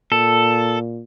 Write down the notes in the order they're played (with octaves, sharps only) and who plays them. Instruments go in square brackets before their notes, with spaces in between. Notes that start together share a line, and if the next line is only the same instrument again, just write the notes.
[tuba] A#2 [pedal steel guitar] A4